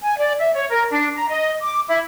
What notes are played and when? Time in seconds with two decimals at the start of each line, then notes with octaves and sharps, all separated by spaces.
0.01 G#5
0.18 D5
0.39 E5
0.54 C#5
0.69 A#4
0.90 D4
1.16 A#5
1.28 D#5
1.62 D6
1.88 E4